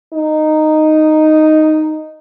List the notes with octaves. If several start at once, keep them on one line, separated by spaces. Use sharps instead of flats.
D#4